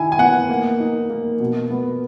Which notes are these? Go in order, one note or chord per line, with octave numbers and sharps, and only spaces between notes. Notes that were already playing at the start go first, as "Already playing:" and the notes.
Already playing: D#3 E4 G#5
G#5
B3 F#5
A#3
D#4
A#3
B2
B3